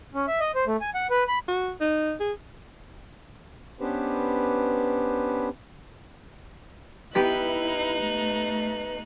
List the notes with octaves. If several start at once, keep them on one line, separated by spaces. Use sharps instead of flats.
C#4
E5
D#5
C5
A3
G#5
F#5
B4
B5
F#4
D#4
G#4
B3 C#4 D4 G4 B4 C5
B3 D#4 E4 G4 B4 F#6 B6
A3